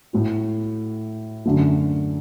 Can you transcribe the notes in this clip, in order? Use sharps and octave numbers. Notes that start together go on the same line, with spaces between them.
A2 A3 F#4
F#2 D3 A3 F#4